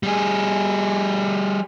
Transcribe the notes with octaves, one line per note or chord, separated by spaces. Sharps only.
G3 G#4